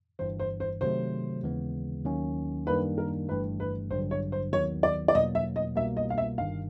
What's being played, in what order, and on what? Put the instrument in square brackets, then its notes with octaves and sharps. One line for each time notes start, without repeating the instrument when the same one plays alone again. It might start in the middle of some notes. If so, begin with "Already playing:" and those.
[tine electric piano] G1 G2 E3 [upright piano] C5
[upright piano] C5
C5
[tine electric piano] C3 D#3 F#3 A3 [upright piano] C5
[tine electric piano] D#2 C#3 E3 G#3 B3
D#2 D#3 F#3 A#3 C#4
[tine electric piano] F#2 D#3 G3 A#3 D4 [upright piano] B4
[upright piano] A#4
[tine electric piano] G1 G2 E3 A3 [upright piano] B4
[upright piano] B4
[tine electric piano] A1 G2 D3 F#3 [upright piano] C5
[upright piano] C#5
C5
[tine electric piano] D#2 D#3 F#3 B3 [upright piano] C#5
[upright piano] D5
D5
[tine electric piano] E2 B2 F#3 A#3 [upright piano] D#5
[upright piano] E5
D#5
[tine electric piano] C2 B2 G3 A#3 [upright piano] E5
[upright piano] D#5
F5
E5
[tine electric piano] G1 G2 D#3 [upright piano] F5